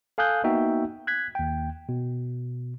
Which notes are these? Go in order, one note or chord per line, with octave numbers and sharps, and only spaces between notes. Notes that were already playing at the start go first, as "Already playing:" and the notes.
A4 F5 G#5 D#6 F#6 G6
A#3 B3 D#4 F#4 E5 G5
F#6 G#6 B6
D#2 G5
B2